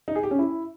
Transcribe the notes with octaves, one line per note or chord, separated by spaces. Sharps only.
D#4
G#4
G4
C#4
E4